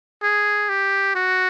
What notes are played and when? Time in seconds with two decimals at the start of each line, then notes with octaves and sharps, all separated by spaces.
0.23 G#4
0.69 G4
1.15 F#4